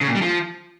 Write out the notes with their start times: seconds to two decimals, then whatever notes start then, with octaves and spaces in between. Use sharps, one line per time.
0.01 C#3
0.08 A#2
0.15 G3
0.22 F3